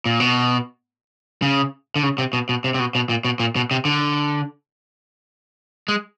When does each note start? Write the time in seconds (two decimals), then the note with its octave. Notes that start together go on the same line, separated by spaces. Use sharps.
0.06 A#2
0.20 B2
1.42 C#3
1.96 D3
2.03 C#3
2.18 C3
2.33 B2
2.49 B2
2.64 C3
2.74 C3
2.80 B2
2.95 B2
3.09 A#2
3.25 B2
3.40 A#2
3.56 B2
3.71 C3
3.85 D3
5.88 G#3